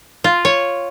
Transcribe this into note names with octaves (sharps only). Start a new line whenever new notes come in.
F4
C#5